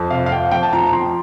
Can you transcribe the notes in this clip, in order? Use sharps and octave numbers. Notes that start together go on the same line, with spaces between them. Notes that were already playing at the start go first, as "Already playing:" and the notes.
Already playing: F2
C3 F5
F5
F2 G5
F2 G5
A5
F3 A#5
A#5
F3 C6